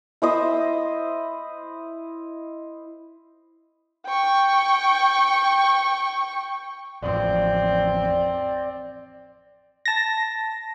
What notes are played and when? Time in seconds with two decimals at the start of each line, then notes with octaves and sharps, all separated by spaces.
0.22 E4 C5 D#5 E6
4.06 G5 C#6
7.02 A1 F2 C4 D5
9.85 A5 A#6